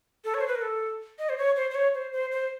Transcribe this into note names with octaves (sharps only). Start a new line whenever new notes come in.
A4
C#5
C5
B4
A#4
A4
D#5
C5
C#5
C5
C5
C#5
C5
C5
C5